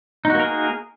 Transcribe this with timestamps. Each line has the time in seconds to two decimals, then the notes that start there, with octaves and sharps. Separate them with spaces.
0.25 D#4
0.30 F#4
0.35 A#3
0.40 A#4
0.45 G#4